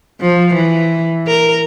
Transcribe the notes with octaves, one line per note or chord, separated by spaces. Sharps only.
F3
E3
A#4